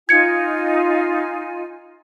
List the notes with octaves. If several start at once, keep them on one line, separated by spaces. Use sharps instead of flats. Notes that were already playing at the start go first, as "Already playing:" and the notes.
D#4 F4 G#5 G#6 C#7